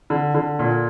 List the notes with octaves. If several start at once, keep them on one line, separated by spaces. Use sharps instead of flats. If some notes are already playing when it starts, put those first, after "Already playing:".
D3
D3
A#2